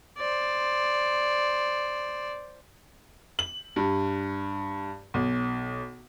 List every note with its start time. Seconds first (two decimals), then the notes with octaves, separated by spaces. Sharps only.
0.18 C5 D5
3.39 F#7
3.76 G2
5.14 B1